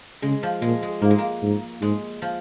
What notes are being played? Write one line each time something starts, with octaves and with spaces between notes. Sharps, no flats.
C#3 G#3
F3
A#2 G#3
G#3
G#2 A#3
G#3
A#3
G#2
G#2 G#3
F3